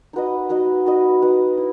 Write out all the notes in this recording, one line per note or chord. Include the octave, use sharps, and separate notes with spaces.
D#4 F#4 B4 D#5
D#4 F#4 B4 D#5
D#4 F#4 B4 D#5
D#4 F#4 B4 D#5
E4